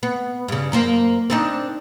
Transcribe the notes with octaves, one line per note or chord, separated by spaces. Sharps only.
B3
G2 C#3
F#2 A#3 C5
C4 D4 D#4